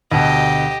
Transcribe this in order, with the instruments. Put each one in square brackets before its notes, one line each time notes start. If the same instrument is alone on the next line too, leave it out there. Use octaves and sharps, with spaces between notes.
[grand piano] D2 B2 [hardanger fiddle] G4 D#5